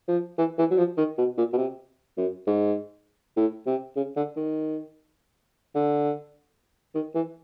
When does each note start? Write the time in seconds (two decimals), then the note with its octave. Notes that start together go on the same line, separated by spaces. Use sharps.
0.08 F3
0.38 E3
0.58 E3
0.71 F#3
0.78 F3
0.97 D#3
1.18 B2
1.37 A#2
1.53 B2
1.57 C3
2.17 F#2
2.47 G#2
3.37 A2
3.66 C3
3.96 C#3
4.16 D3
4.36 D#3
5.75 D3
6.95 D#3
7.15 E3